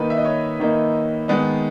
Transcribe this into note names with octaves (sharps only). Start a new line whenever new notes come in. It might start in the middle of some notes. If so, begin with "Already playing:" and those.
Already playing: D#3 A#3 D#4 B4
E5
D#5
C#5
D#3 A#3 D#4
D#3 G#3 B3 D#4